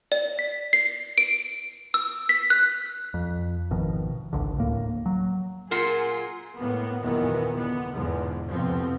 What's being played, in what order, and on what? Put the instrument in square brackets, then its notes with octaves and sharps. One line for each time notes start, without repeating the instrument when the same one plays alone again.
[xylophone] D5
B6
C7
D7
E6
B6
F#6
[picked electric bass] F2
G#1 B2 D#3 F3
G#1 C#2 D3
D1 A2 A#3
F#3
[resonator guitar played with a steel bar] A#2 F4 F#5 [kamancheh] G#4 C6 [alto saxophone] A#4
[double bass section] A2 A#3 B3
F#1 D#2 A#2 D#3 E3 B3
D3 B3
E2 G#2 B2 D3 F3
C2 F2 F3 B3 C4